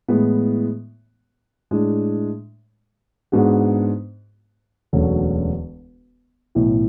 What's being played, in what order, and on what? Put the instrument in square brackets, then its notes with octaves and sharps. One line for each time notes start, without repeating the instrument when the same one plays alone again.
[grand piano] A2 E3 G#3 B3
A2 G#3 D4
G#2 G#3 B3 D4 F#4
E1 D2 D3 F#3 C#4
B1 A2 E3